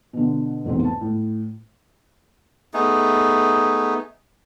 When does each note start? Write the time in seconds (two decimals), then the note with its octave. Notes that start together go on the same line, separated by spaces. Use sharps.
0.13 B2 D3
0.65 F1 B1 E2 G#2 C4
0.85 A5
1.01 A2
2.74 A3 B3 D#4 G#4